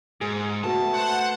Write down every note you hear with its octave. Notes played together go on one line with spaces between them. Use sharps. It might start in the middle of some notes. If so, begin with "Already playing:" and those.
G#2 G#4
A3 B3 F#4 A5
C5 F#5